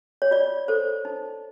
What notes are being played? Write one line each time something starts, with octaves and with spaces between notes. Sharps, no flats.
C#5
F4 D5
A4 C5
D#4